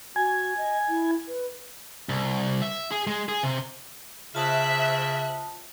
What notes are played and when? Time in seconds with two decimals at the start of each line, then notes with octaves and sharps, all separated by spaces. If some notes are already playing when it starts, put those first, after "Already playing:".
0.16 F#4 G#5
0.58 D#5
0.88 E4
1.28 B4
2.09 C2
2.62 E5
2.91 G#4
3.07 G#3
3.29 G#4
3.43 C3
4.35 C#3 F4 C5 E5 A5 D#6 F#6 B6